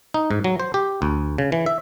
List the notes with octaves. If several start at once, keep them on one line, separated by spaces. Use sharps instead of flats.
D#4
G#2
F#3
C5
G4
D2
C#3
E3
E5